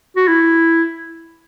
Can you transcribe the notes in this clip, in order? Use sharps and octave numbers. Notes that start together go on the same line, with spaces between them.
F#4
E4